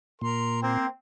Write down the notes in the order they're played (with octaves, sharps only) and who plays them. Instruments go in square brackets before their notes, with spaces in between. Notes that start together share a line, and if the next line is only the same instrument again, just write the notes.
[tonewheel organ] A#2 [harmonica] A#4 C6
[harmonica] A#3 C5 [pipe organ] C4